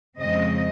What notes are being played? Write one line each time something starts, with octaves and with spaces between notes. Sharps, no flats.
F2 C#3 G#3 C4 D#5